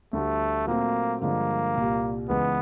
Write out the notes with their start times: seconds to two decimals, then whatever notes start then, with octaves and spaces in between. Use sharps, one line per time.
0.13 D2 D3 G3 A3
0.67 A#2 F#3 A3 A#3 C4
1.21 G2 D3 F3 G#3 A#3
1.75 C2 A#2 G3
2.29 C#2 C#3 E3 G#3 B3